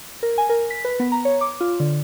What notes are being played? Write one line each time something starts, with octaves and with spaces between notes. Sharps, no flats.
A#4
G#5
A#4
B6
B4
B3
A#5
C#5
D6
F4
D3